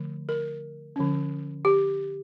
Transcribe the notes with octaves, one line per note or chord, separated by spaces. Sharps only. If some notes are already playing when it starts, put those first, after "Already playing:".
Already playing: D3 F3 A3
A#4
D3 F3 C#4
G4